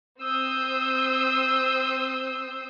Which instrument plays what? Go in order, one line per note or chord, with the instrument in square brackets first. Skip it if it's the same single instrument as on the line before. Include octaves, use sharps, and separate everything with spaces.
[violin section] C4 D#6 E6 G6 C7